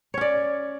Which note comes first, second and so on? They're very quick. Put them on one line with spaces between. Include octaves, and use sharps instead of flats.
C#5 C#4 D5